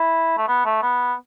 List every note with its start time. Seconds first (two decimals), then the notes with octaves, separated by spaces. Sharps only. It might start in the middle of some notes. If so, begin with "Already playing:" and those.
Already playing: E4
0.37 A3
0.48 B3
0.65 A3
0.82 B3